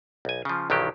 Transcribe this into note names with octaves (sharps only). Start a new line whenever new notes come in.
B1 G#5
C#3 F3
B1 G2 D#3 E3 F#3 G4